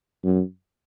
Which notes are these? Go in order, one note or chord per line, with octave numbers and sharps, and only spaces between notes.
F#2